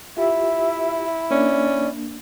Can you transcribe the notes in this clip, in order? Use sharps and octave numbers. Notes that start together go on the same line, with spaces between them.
E4 F4 G4 E5
A#3 C#4 D4 D5